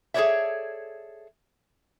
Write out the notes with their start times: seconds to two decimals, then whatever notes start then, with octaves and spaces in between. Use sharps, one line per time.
0.14 G#4 A4 B4 C#5 D5 E5